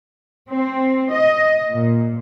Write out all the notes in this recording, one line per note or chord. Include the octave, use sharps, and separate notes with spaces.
C4
D#5
A#2